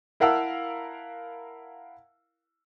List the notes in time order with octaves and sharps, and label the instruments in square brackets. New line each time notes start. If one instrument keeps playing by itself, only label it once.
[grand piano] E4 A#4 F5 F#5 A5 E6